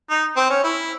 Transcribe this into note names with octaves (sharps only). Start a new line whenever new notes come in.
D#4
C4
C#4
E4